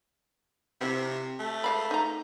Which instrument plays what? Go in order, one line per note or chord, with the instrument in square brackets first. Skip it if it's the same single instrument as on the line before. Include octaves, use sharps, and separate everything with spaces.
[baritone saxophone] C3 [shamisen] C4 E4
[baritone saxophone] A3
[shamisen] G#3 F5 B5
D#4 A#5